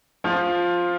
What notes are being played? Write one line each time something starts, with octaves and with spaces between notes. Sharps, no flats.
F3 F4